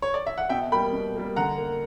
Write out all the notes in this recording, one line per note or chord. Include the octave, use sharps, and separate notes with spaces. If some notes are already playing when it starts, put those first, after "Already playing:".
C#5
D5
E5
F#5
B2 E5 G5
G3 A#3 G5 B5
B2
G3 A#3
D3 F#5 A#5
A#3